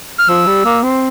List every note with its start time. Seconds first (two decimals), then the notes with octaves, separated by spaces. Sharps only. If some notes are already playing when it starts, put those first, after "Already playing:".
0.19 F6
0.29 F3 E6
0.46 G3
0.65 A#3
0.84 C4